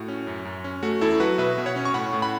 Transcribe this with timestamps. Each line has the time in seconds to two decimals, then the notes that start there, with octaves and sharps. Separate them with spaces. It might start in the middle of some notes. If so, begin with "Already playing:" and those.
Already playing: A2 F#4
0.08 C#4
0.27 F#2
0.45 F#2
0.64 C#4
0.83 A3 F#4
1.01 E2 E4 A4
1.20 F#3 F#4 B4
1.38 B2 B4 E5
1.58 B2
1.66 C#5 F#5
1.76 C#4
1.85 C#6
1.94 A2 F#5 B5
2.13 A2
2.22 F#5 B5